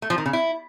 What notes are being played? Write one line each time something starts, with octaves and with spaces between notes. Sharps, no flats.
A3
F3
D#3
C#3
E4